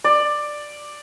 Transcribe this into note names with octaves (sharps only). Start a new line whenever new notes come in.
D5